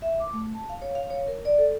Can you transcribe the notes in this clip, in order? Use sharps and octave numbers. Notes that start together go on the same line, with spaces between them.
E5
D6
A3
A5
F5
C#5
F5
C#5
A#4
D5
A4